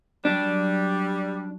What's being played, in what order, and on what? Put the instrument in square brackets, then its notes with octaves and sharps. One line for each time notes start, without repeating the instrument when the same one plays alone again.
[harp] F#3 [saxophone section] G3 [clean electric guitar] D4